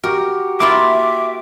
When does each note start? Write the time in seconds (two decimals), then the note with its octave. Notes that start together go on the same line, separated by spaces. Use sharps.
0.04 F#4 G4 A#4
0.60 A#3 E4 F4 E5 D6